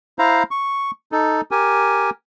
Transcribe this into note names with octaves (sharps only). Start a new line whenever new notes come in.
E4 C5 F5 A#5
C#6
D#4 A4
G4 A#4 G#5